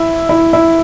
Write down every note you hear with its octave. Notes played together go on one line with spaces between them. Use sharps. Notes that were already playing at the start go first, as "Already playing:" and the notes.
Already playing: E4
E4
E4